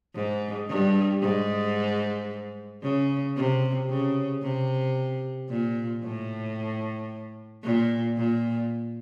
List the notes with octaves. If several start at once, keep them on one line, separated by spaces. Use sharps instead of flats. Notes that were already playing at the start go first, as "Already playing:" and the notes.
G#2
G2
G#2
C#3
C3
C#3
C3
A#2
A2
A#2
A#2